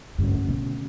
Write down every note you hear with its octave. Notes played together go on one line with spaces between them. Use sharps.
G2 D3 A3 C#4 F#4
A2
B2